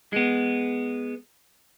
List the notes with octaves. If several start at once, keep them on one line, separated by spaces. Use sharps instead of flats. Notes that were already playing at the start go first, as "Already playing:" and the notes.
G#3 B3